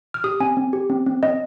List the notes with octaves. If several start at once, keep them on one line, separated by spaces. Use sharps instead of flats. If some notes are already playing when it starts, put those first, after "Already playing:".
F6
G4 D#6
C4 G#5
C4
G4
C4
C4
C4 D#5